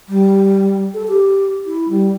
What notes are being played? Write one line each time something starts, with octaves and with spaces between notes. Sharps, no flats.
G3
A4
G4
E4
G3